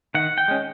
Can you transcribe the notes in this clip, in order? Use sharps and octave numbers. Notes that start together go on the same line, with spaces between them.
D#3 F#5
G5
G#3 C#4